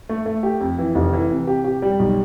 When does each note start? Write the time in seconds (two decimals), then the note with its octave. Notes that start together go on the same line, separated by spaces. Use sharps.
0.09 A3
0.26 A3
0.43 G4
0.61 F2
0.78 E3
0.95 F1
1.13 E3
1.30 C3
1.47 G4
1.64 G4
1.82 G3
1.99 B1